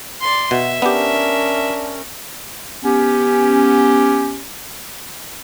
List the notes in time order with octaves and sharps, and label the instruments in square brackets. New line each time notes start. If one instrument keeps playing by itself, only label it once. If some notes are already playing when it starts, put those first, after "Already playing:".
[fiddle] D5 C6
[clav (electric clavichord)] B2 [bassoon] F#4 [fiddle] E5
[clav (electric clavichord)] B3 G4 [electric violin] C#4 A#4 [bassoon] D4
[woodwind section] B3 C#4 G4